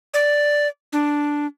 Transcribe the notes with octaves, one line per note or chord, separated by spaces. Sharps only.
D5
D4